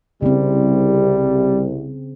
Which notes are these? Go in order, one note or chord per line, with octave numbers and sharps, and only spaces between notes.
C2 C#3 G3 C4